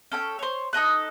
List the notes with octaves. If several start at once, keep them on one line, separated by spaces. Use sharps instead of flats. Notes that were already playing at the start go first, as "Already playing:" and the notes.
C#4 A4 G5
C5 C#5
D#4 A4 D#5 F#6